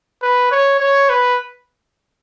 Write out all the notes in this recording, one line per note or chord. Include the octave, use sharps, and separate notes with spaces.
B4
C#5
C#5
B4